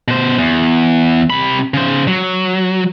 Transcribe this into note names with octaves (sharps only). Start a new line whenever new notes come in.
B2 C5
E2
C3 B5
C#3 C5
F#3